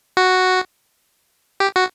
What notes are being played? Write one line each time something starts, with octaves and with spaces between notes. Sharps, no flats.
F#4
G4
F#4